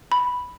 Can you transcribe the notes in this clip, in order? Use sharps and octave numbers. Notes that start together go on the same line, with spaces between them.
B5